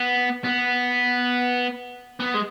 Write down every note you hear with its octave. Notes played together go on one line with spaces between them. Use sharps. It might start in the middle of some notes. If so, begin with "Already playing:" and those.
Already playing: B3
B3
B3
G#3